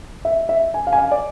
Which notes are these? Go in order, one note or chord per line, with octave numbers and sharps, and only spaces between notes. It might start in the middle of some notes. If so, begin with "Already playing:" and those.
E5
E5
G#5
F5
G#5
F5
D5